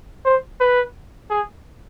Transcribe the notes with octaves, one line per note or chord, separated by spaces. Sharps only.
C5
B4
G#4